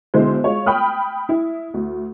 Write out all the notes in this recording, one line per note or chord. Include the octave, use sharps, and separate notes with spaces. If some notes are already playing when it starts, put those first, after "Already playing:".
B1 D3 G#3 E4 C5
G#3 F4 C#5
G5 B5 D#6 F6
E4
D2